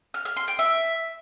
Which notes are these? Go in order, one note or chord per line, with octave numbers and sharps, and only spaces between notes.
F6
F6
C6
G5
E5